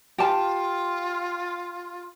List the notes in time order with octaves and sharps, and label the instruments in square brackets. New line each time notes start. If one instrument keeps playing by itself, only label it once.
[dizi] F4 [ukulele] G4 A5